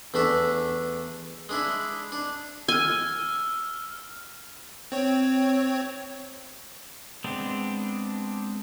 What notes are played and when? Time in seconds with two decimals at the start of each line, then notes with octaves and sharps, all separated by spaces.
0.14 E2 A3 D4 E5
1.49 G#3 D4 E4
2.12 D4
2.68 G#5 E6 F6
4.92 C4 C#5
7.24 G#3 B3 C4 D4